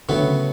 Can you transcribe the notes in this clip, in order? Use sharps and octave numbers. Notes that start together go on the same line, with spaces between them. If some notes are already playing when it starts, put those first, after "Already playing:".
A2 D3 F#3 B3
C#3